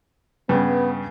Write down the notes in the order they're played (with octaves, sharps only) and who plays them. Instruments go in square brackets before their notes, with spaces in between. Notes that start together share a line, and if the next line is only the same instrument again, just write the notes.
[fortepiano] G2 C#3 [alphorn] B3